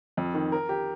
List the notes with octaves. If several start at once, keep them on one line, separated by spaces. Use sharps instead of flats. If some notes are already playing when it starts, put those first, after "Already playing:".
F2
D#3
A#4
G4